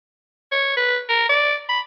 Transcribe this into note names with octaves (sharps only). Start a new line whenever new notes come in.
C#5
B4
A#4
D5
B5